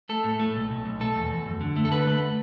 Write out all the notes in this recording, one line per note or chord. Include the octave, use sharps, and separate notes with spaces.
A3 A4
A2
A3
B1
B1
B1
A3 A4
E2
E2
F#2
D3
A3
A4
D3 B4
A3